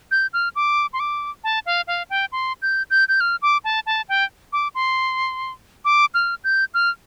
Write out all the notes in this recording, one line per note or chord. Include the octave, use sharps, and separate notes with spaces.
G6
F6
D6
C6
D6
A5
F5
F5
G5
C6
G6
G6
G6
F6
D6
A5
A5
G5
D6
C6
D6
F6
G6
F6